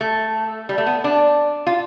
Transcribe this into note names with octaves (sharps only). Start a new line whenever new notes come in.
A3
G3
A3
B3
D4
F4